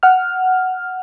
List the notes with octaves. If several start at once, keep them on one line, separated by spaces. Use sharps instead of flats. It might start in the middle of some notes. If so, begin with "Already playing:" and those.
F#5 F6